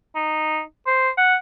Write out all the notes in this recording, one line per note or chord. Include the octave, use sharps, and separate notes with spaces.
D#4
C5
F#5